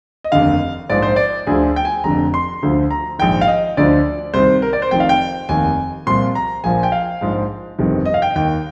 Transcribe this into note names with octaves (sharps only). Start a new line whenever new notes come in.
D#5
F1 D#2 D3 F5
A#1 G#2 F3 D5
C5
D5
D2 D3 F3 G#4
G5
G#5
F1 F2 D3 A#5
C6
D2 D3 F3
A#5
A#1 G#2 D#3 G5
F5
D#5
D2 D3 F3 D5
C2 C3 D#3 C5
A#4
D5
C5
F1 F2 D#3 G5
F5
G5
F1 D#2 D#3 G#5
C2 A#2 F3 C6
A#5
A#1 A#2 F3 G#5
G5
F5
A#1 G#2 F3
G1 F2 C3 D#3
D#5
F5
G5
D#2 D#3 G5